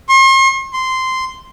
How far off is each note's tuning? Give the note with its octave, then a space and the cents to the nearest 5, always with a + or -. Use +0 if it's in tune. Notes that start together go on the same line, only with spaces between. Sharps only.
C6 +45
C6 -10